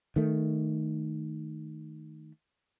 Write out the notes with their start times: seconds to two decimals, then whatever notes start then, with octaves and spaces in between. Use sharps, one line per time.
0.16 D#3 A3